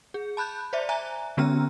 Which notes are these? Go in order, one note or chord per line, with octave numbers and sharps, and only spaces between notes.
G#4
A5 B5 F#6 G6
C5 D5 E5
E5 G#5 A#5 F#6
D3 G#3 B3 C#4 A#5 F6